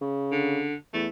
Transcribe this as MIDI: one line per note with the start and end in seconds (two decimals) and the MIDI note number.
0.01 0.66 49
0.32 0.74 50
0.94 1.07 40
0.94 1.07 57